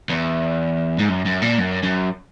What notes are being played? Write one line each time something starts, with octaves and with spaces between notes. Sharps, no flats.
E2
G#2
F#2
F#2
A#2
F#2
F#2